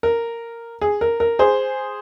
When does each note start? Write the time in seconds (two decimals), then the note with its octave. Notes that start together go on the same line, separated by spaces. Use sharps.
0.03 A#4
0.81 G#4
1.01 A#4
1.20 A#4
1.39 G#4 C5